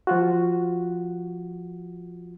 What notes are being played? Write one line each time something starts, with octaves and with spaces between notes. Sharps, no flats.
F3 F4 F#4